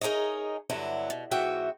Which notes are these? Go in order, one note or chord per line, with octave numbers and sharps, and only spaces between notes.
D#4 G#4 A#4 C#5 D#5
G2 D3 F#3 B3 E4
B2
G#2 E3 B3 F#4 E5 G5